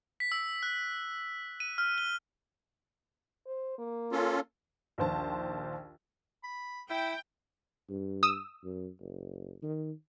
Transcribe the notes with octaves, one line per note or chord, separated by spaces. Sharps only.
B6
E6
F#6
D#7
F6
G7
C5
A#3
C#4 F4 A4
A#1 D#2 C5 A5
B5
E4 G5
G2
D#6 E6
F#2
F#1
D#3